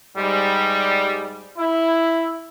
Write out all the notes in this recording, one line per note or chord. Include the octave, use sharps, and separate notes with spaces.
G#2 G3
E4